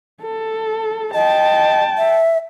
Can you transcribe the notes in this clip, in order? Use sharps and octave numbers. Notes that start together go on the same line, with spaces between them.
A4
D#5 G5 A5
E5